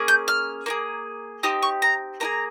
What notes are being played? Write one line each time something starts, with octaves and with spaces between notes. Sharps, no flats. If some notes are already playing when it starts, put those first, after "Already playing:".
Already playing: A#3 C#4 G#4
G6
F6
A#3 F4 G#4
C4 D#4 G4 D#6
C#6
A#5
A#3 D#4 G#4 A#5